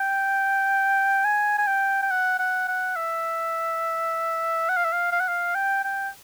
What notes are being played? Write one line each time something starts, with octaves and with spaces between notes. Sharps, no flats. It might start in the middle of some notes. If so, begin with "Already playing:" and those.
Already playing: G5
G#5
G#5
G5
G5
F#5
F#5
F#5
E5
F#5
F5
E5
F5
F5
F#5
F5
G5
G5